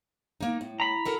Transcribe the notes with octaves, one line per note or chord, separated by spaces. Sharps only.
A#3 D#4
A2
A#5 B5
F#4 A4 A#4